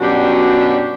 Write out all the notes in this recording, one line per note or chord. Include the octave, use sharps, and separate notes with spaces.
F#2 B2 G3 D4 F#4 G4